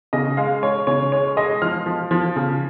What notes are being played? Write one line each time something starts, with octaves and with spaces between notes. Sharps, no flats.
C#3 D#5
G#3 F5
G#3 C#5
C#3 C#5
G#3 C#5
G#3 D#5
F3 F6
F3
F3
C#3